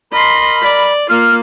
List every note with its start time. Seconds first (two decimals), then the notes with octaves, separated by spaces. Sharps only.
0.13 A#4 D#5 B5 C6
0.61 D5
1.10 A#3 F4 F6